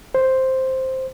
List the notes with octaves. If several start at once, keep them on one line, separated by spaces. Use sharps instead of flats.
C5